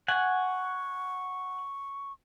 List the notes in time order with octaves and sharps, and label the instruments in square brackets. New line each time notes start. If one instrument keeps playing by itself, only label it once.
[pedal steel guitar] F#5 G#5 [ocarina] C#6